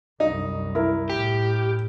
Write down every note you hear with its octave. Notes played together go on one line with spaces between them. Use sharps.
C2 F#2 D#4
E4 A#4
A2 G4